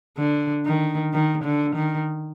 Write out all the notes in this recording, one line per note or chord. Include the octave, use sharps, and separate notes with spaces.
D3
D#3
D#3
D3
D#3